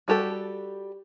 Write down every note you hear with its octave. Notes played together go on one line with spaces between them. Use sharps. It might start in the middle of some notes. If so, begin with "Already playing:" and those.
G3 F#4 G4 A4